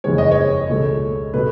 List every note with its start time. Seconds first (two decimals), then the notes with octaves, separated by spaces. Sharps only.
0.04 F#1 E2 D#3 G#3 C#5
0.18 D#5
0.31 C#5
0.69 C#2 B2 A3
1.34 B2 A3 B4